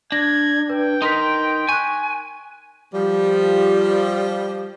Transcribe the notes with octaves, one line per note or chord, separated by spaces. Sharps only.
D4 G#6 A#6
B4 G5
D#4 A#4 C6 B6
G#5 C#6 F#6
F3 G3